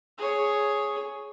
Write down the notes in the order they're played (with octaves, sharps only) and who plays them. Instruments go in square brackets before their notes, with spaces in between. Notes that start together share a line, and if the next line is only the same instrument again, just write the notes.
[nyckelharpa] G#4 C#5